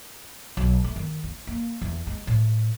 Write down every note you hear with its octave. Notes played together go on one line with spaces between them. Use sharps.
B1
A3
D#3
E4
A#3
E2
G#3
A2